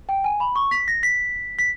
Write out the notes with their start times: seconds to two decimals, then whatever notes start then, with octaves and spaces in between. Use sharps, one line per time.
0.09 G5
0.24 G#5
0.40 B5
0.56 C#6
0.71 B6
0.88 A#6
1.03 B6
1.59 B6